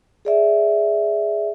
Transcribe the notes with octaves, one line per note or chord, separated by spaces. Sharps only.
G#4 D5 E5